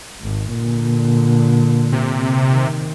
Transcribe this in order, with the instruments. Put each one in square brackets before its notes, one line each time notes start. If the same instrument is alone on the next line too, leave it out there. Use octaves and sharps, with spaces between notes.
[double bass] G#1
A#2 D3
[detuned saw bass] C3
[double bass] D#3